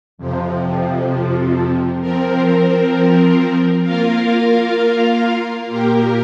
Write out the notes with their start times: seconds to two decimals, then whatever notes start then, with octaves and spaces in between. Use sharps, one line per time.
0.18 F2 C3 F3
2.01 F3 C4 A#4
3.84 A#3 F4 A#4 F5
5.67 A#2 A#3 G4 A#4